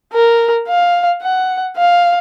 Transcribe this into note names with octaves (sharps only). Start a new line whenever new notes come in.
A#4
F5
F#5
F5